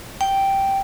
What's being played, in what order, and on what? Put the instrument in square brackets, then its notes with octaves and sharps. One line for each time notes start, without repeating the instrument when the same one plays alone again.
[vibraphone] G5